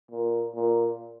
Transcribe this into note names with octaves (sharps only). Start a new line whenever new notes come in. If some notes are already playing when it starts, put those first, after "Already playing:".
A#2
A#2